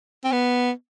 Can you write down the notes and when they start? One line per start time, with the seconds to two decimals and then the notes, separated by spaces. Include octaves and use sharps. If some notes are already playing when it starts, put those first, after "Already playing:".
0.24 C4
0.32 B3